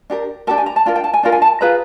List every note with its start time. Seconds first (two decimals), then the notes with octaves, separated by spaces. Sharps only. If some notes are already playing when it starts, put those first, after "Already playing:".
0.10 D4 G4 A#4
0.47 D4 G4 A#4 A5
0.58 G#5
0.66 A#5
0.76 A5
0.86 D4 F4 A#4
0.96 G5
1.04 A5
1.14 G#5
1.23 D4 F4 A#4
1.32 G#5
1.42 A5
1.61 F4 G#4 B4 A#5